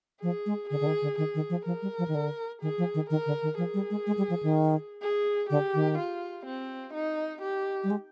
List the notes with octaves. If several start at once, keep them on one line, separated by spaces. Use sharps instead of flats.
F3 G#4
G#3
D3 G#4
D3
D#3
D3
D#3 G#4
D#3
F3
F3 A#4
G3
F3
D#3
D3
D#3 G#4
F3
D#3
D#3 A#4
D3
D#3
F3 G#4
G3
G#3
G#3
G3
F3
D#3
G#4
D3 G4
D#3
F4
C4
D#4
G4
G3
G#3